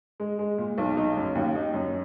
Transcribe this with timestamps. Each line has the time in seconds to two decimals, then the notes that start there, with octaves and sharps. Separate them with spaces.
0.20 G#3
0.39 G#3
0.58 A#2
0.78 B1
0.97 D#4
1.17 F#2
1.35 D#2
1.55 D#4
1.74 F#2